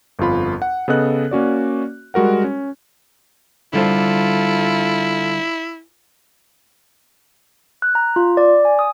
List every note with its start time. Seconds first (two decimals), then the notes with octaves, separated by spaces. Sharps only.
0.19 G1 F2 F4 B5
0.62 F#5
0.88 C#3 B3 A4 D#5 F#6
1.31 A#3 C#4 F#4 D5
2.14 G3 G#3 F#4 A#4 F#5
2.44 C#4
3.73 D3 G3 E4 F4 A4 C5
7.82 F#6
7.95 A#5
8.16 F4
8.37 D5
8.65 G#5
8.79 D#6